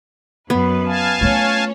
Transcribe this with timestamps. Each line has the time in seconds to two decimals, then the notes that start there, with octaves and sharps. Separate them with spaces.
0.50 F#2 B3 B4
0.86 F5 G#5 A5
1.21 A3 C#4 F4 C#5